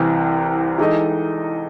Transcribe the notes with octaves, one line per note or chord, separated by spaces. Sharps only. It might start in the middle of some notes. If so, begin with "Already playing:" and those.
Already playing: C2 C3 E3
E3 G#3 D#4 A4 D#5